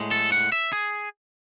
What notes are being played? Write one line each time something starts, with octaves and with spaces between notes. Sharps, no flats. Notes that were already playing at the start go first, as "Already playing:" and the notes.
Already playing: A2 G#3
A4
F#5
E5
G#4